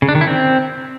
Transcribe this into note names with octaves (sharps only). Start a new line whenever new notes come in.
C#3
D4
D#3
E4
C4